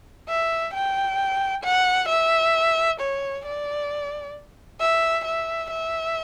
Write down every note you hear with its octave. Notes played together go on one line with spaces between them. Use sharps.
E5
G5
F#5
E5
C#5
D5
E5
E5
E5